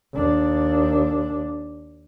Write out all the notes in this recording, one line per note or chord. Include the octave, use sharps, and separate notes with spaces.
D#2 D4